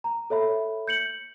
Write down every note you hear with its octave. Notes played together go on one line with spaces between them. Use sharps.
A#5
A4 C#5 E5 B5
G6 C#7 F#7